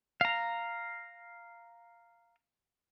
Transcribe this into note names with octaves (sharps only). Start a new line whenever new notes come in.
F5 A#5